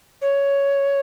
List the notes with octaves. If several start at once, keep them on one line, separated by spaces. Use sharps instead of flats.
C#5